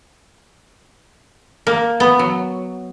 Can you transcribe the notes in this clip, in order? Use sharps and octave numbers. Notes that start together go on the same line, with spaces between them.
A#3
B3
F#3